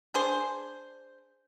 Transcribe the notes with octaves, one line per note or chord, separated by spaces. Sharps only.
D4 G#4 C5